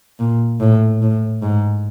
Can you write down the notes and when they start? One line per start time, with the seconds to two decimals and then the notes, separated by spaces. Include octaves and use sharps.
0.19 A#2
0.60 A2
1.01 A2
1.42 G#2